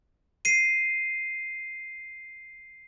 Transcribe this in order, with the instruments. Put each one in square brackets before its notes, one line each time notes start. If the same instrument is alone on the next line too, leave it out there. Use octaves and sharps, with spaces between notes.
[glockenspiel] C7 D#7